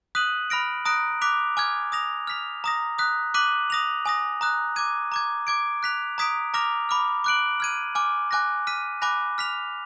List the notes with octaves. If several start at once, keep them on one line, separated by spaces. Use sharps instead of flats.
D#6 F#6 B6 D#7 F#7
B5 F6 A#6 D7
A#5 D#6 F#6 A#6 D7
D6 F#6 B6 F7
G#5 D6 F6 G#6
D#6 A#6 F7
F6 B6 F7
A#5 D#6 A#6
D#6 F#6 B6
D6 F#6 B6 D#7 F#7
D#6 A#6 F7
G#5 D#6 A#6
A#5 D#6 F#6
D6 G#6 D#7
A#5 D6 G#6
D6 G#6 D7
F#6 B6 F7
A#5 D#6 G#6 B6 D7
A#5 D6 F6 A#6 F7
B5 D6 F6
D6 F#6 D7 F#7
F6 G#6 D#7
G#5 D6 F6
G#5 D6 F#6 A#6
F6 B6 D#7
G#5 B5 D6 F#6 A#6
F6 B6 F7